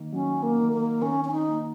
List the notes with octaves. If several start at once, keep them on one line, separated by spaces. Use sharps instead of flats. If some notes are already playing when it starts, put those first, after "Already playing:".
Already playing: D#3 A#3
F#3 C#4
A#3
D#3
A#3
D#3 C#4
C#4
D#4
A#3